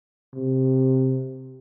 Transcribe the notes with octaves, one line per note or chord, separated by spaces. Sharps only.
C3